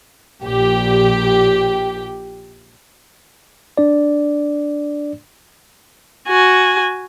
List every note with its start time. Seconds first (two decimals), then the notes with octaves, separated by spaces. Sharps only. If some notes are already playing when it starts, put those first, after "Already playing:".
0.41 A#1 G4
3.78 D4 D5
6.28 F#4 G#5